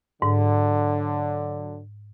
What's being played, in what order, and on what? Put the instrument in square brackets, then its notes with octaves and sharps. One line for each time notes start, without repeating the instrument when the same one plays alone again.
[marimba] G#2 [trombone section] D3 F#3